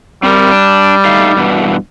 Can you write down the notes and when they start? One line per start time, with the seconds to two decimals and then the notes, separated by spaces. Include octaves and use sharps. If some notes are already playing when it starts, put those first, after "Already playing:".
0.23 G3 C4 A#4
0.52 D4
1.05 A3 D#4 F5
1.37 G2 B2 E3